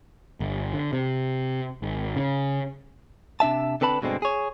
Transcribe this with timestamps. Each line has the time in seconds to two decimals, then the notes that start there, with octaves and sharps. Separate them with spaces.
0.40 G1
0.73 D3
0.93 C3
1.82 G#1
2.16 C#3
3.40 C3 D4 E5 A5
3.81 D3 C4 B4 A5 B5
4.02 G2 B2 D3 G#3 C4
4.22 G#4 C#5